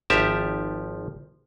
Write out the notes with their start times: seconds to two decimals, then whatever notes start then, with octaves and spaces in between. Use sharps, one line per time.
0.10 G#1 F3 G4 E5 A5 A#5